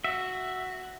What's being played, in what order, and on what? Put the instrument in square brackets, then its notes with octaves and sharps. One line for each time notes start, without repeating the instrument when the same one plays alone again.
[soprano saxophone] F#4 [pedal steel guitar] E5